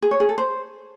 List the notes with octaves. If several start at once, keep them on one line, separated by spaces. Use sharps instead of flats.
G#4
C#5
G#4
A4
C5